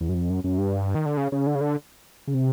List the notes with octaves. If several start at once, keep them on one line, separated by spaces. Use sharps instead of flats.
E2
F#2
F2
F#2
F#2
G2
D#3
D3
C#3
C#3
D3
C#3
D3
C#3
C3